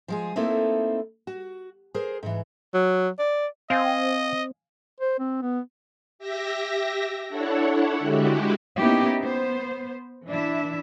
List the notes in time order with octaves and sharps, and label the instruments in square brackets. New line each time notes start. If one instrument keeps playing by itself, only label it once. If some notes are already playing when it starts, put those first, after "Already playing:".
[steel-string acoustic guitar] F3 G#3 G#4
A3 A#3 C4 D#4 E4 A4
F#4
G#4 A#4 C5
G#2 E3
[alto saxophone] F#3
D5
[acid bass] C4 [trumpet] D#5 [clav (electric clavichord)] F5 G#5
[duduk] C5
C4
B3
[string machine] G4 E5 A#6
D4 E4 A4 C#5 F#5
D3 G#3 E4 F#4 G4
[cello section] A#3 B3 C#4 D#4 E4 G4
B3 C5
E3 D4 E4 E5